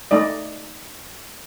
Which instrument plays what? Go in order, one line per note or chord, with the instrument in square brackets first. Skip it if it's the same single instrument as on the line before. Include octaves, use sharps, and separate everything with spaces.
[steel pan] A3 D#4 D5 D#5